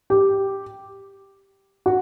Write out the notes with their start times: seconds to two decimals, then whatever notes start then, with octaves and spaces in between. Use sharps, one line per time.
0.10 G4
1.86 F#4